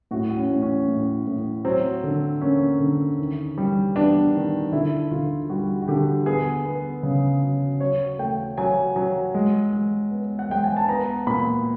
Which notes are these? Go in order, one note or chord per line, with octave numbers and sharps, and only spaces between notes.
A2 F#4
C#4
A2
C#4
A2
A2
F#3 C4
D3
A#3 C#4
D3
D#3
G3
B3 D4
D#3
D3 E4
D3 F4
G3 F#4
F#4
D3 G4
B3 G#4
B3
C#3
F#3
F#3 C#5
A3 G5
F#3 G#5
F#3
G#3
G#3
B3
F#5
G#3 G5
G#5
A5
B3 A#5
A#2 B5